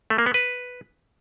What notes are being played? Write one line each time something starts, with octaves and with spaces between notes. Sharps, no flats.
A3
A#3
B3
B4